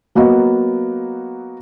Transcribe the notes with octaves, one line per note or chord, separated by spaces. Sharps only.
F#3 A#3 B3 F#4 D#5